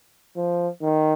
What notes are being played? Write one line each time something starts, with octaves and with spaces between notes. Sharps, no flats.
F3
D#3